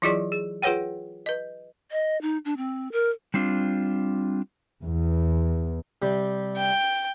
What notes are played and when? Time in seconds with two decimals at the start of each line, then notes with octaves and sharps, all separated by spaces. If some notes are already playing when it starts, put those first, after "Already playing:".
0.02 E3 F#3 E4 F4 G#4 D5
0.32 G#4
0.62 F4 G#4 B4 C#5 F#5 G5
1.26 B4 D#5
1.91 D#5
2.22 D#4
2.45 D4
2.57 C4
2.92 A#4
3.34 G3 C4 D4 F4
4.82 E2
6.02 C3 G3
6.57 G5